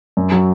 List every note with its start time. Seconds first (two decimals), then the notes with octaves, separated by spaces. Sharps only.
0.17 F#2
0.32 F#3